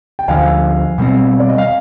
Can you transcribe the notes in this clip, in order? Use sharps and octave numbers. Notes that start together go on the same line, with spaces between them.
G5
D2 D3 F3 F5 G#5
B2 G3 C4
D5
D#5
F5